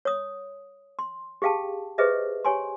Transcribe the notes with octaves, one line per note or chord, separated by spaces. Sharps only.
C#5 D#6
C6
G4 G#4 F5 G5 A5
G4 G#4 B4 C5 D#5 E5
G4 C#5 G#5 C6